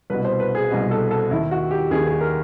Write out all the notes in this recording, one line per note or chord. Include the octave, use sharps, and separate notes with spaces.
C2 B2 B4
C5
B4
G#4
C2 B2
A4
A4
D#2 D#3 E4
F#4
G4
D#2 D#3 G#4
G#4
A#4